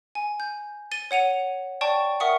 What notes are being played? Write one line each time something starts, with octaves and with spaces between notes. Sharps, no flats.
G#5
G6
A6 D#7 G7
C#5 F#5 D#7 F7
D5 G5 A5 C#6
A#4 E5 F#5 C#6 D#6 C#7